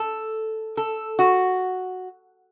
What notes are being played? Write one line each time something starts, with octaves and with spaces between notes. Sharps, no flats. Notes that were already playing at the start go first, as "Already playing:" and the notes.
Already playing: A4
A4
F#4